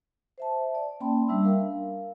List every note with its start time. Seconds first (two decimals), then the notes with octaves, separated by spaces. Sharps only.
0.38 C5 E5 A5
0.75 D5
1.00 A#3 C#4 G5 A5 B5 C6
1.28 G3 D4 E5 E6
1.44 A#4 F5